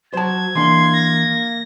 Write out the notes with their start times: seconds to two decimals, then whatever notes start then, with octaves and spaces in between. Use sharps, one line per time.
0.13 F#3 C5 A5 G#6
0.55 E3 A#3 D4 C6
0.94 A#6